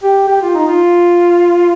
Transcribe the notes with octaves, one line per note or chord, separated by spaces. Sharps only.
G4
G4
F4
D#4
F4